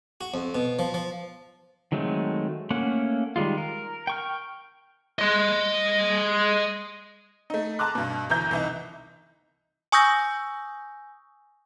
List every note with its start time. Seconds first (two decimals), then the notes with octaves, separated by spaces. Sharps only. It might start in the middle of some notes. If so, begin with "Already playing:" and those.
0.21 F#4
0.34 F2
0.55 B2
0.79 F3
0.94 F3
1.92 D#3 F#3 G#3 A3 C4
2.70 A3 A#3 C#4 F#5
3.36 D#3 G3 G#3 F4
3.58 A#4
4.07 G5 C#6 F6
5.19 D#5 C6
7.50 A3 D#4
7.79 A5 A#5 C6 D6 F#6
7.95 G2 B2
8.30 G1 E3 A#5 G6
8.51 C2 E3 D#4
9.92 G#5 C#6 D#6 E6 G6 A#6